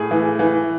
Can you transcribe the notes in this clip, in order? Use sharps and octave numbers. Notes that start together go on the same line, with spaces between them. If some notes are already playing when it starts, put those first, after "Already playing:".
Already playing: A2 G#4
E3
E3